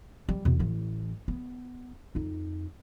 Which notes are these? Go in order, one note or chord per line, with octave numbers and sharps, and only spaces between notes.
G3
E2 B2
A1 E3
B3
F2 D#4